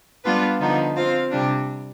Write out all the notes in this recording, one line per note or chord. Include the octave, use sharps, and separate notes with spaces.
G3 B3 D4 F4 B4
D3 F3 B3 D#4
C4 F4 C5 F5
C3 G3 D4